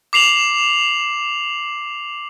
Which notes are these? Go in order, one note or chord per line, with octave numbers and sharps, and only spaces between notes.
D6 C7 F7 F#7